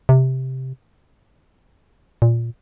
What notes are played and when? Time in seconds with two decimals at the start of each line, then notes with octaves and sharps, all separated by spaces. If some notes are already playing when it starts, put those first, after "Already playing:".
0.09 C3
2.22 A#2